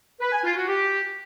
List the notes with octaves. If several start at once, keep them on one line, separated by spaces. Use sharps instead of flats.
B4
G#5
F4
F#4
G4